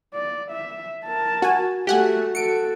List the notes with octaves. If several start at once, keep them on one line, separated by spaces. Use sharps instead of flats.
D5
E5
A#4 A5
F#4 G#5
A3 F#4 G4 F#5 G#5
F#4 A4 C#7 D7